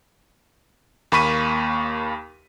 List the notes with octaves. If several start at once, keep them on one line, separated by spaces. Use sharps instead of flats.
D#2 A#3 B5 C#6 B6 D#7